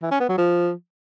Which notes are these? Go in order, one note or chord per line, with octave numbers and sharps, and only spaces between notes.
E3
C#4
B3
F#3
F3